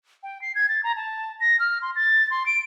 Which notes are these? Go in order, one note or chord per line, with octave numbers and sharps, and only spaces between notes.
G5
C7
G#6
A6
A#5
A5
A#6
F6
C6
A6
C6
D7